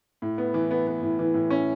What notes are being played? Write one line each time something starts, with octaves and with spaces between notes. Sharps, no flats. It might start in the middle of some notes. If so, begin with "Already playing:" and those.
A2
B3
E3
B3
B3
A2
E3
A2
C#4